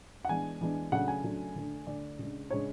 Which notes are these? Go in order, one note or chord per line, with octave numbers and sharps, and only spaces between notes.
F#5
E3 G#3 B3 D4 G#5
E3 G#3 B3 D4
C#3 F#3 A3 D4 F#5
G#5
C#3 F#3 A3 D4
D3 A3 D4
D3 A3 D4 D5
C#3 G#3 D4
C#3 G#3 D4 C#5